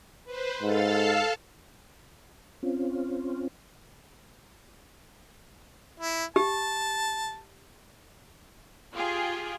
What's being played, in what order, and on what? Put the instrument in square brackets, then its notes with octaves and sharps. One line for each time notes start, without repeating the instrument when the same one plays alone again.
[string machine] B4 C5
[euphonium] G#2 [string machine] A4 F5 A5
[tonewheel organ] C4 C#4 F4
[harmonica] E4
[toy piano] G4 [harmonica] A5
[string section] F4 G4 G#4